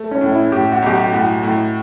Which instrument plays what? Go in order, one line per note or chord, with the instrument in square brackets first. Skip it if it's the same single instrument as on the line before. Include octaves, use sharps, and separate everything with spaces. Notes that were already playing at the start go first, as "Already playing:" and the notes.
Already playing: [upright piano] A3
[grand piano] C#4
[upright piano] A2
[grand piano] E4
[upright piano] A2 [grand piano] G4
[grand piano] F#4
[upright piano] B1 [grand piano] G4
[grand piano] F#4
[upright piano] A2 [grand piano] F#4
[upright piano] A2